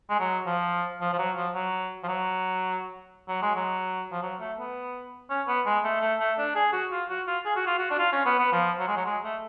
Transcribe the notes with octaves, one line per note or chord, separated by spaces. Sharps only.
G#3
F#3
F3
F3
F3
F#3
F3
F#3
F3
F#3
F#3
G#3
F#3
F3
F#3
A3
B3
C#4
B3
G#3
A3
A3
A3
D4
G#4
F#4
F4
F#4
F4
G#4
F#4
F4
F#4
D4
F4
C#4
B3
B3
F3
F#3
G#3
F#3
G#3
A3